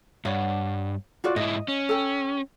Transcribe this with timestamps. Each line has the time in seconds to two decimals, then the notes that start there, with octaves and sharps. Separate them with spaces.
0.25 G2 C#5 D5 F#5
1.24 F4 F#4 D5
1.36 G#2 E4 D#5
1.68 C#4
1.89 A4 G5